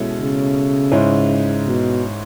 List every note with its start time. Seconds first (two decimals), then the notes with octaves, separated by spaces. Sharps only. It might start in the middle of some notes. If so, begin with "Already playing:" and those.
Already playing: B2 G#3 C#4 E4 A4
0.18 C#3
0.92 G#2 G#3 C#4 E4
1.66 B2